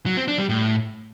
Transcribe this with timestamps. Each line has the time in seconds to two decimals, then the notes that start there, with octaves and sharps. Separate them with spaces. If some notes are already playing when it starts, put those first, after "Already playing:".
0.06 F#3
0.17 C4
0.28 D4
0.39 G3
0.49 A2